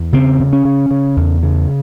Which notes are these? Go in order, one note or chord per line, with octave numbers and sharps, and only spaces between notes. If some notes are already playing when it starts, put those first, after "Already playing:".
Already playing: E2
C#3 C4
C#3
C#4
C#3
C#3
E2
C#3